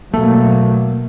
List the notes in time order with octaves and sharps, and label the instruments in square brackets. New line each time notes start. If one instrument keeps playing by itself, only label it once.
[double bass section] B2 F#3 A#3 [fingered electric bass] A3